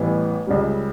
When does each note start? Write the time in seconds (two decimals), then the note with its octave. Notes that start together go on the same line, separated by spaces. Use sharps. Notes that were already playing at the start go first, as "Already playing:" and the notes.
Already playing: A1 A2 E3 G3 B3
0.47 C#2 C#3 G3